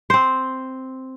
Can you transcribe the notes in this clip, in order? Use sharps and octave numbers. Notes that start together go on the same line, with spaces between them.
C4 C5